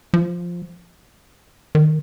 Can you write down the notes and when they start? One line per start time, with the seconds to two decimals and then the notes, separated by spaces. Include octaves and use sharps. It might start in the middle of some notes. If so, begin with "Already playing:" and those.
0.14 F3
1.75 D#3